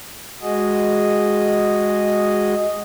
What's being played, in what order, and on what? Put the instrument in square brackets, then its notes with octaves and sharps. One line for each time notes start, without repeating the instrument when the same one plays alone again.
[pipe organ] G#3 F#4 G#4 D#5